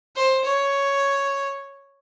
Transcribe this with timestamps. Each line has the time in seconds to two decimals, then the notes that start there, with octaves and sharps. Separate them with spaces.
0.16 C5
0.44 C#5